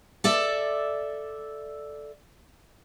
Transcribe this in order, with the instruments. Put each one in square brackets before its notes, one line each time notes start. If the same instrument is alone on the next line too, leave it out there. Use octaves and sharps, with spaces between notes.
[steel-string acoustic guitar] A4 D5 E5